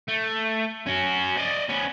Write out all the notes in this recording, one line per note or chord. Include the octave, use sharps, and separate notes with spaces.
A3
C#4 F#4
D5 D#5
B3 C#4